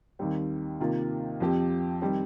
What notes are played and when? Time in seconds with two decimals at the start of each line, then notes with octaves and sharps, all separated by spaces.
0.19 D#2 D#3 G3 C4
0.80 C3 D#3 A#3 F4
1.40 F2 F3 C4 G4
2.02 D#3 G3 C4